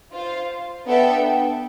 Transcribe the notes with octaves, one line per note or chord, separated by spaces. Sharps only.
F4 C5 F5
B3 D4 A4 E5 G5